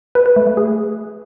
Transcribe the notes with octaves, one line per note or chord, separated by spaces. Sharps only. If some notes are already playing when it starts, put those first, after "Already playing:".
B4
B4
A3
A3
G#4